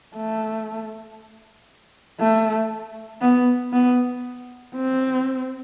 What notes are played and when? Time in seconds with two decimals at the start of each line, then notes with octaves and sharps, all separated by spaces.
0.16 A3
2.20 A3
3.21 B3
3.73 B3
4.75 C4